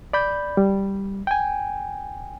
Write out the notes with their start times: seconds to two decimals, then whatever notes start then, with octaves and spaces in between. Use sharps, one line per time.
0.13 D5 B5 G6
0.57 G3
1.27 G5 G#5